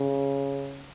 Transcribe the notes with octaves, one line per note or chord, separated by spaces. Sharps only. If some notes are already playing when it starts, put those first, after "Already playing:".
Already playing: C#3